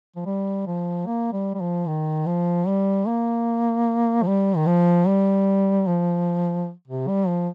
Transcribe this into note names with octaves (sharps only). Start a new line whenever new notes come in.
F3
G3
F3
A#3
G3
G3
F3
D#3
F3
G3
A#3
F3
G3
D#3
F3
G3
F3
C3
G3
F3